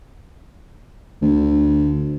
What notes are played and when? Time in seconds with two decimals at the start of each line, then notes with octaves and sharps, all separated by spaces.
1.22 D2